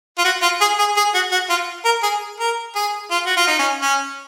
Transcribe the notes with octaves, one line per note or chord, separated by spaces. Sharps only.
F4
F#4
F4
G#4
G#4
G#4
F#4
F#4
F4
A#4
G#4
A#4
G#4
F4
F#4
F4
D#4
C#4
C#4